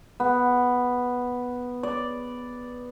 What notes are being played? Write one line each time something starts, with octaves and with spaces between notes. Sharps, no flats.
B3
D5